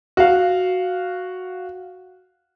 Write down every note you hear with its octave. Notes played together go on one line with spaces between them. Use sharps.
F#4 F5